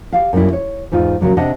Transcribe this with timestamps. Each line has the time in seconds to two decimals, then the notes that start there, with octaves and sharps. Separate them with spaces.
0.13 G4 F5
0.33 F#2 A#2 F#3 G3 E4
0.53 C#5
0.92 E2 G#2 D#4 F4
1.21 A#2 C#3 F#3 G3
1.37 C3 D4 G4 D#5 F#5